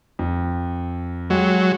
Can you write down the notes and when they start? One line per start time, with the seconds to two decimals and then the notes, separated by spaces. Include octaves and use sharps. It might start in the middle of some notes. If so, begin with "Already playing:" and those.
0.19 F2
1.30 F#3 G#3 G4 G5